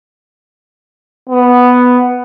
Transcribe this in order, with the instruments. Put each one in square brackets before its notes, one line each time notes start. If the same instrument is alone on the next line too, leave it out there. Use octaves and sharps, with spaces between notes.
[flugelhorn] B3